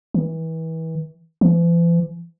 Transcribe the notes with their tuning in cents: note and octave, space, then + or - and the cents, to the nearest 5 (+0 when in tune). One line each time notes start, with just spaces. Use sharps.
E3 -30
E3 +45